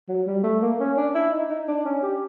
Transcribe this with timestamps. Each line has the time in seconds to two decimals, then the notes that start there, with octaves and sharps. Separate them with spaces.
0.09 F#3
0.27 G3
0.44 A3
0.62 A#3
0.80 C#4
0.97 D4
1.15 E4
1.32 D#4
1.50 D#4
1.68 D4
1.85 C#4
2.03 G4